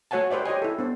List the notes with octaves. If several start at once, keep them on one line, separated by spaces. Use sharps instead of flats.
A3 F#4 C#5 F#5 G#5 A5
G4 B4 C5 D5 E5
G4 C#5 D#5 G#5
E4 A4
B3 D4 C5